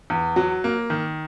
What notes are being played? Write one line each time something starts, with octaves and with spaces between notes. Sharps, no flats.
E2
F#3
A#3
D#3